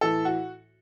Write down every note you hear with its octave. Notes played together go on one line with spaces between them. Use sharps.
A2 E3 A4
F#4